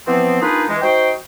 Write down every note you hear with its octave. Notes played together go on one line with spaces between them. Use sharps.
E3 F3 B3 C4
A#3 D4 D#4 F4 G#4 B4
E3 G#3
D#4 F#4 C5 G5